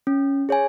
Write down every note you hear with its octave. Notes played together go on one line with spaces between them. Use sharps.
C#4
G#4 C#5 G#5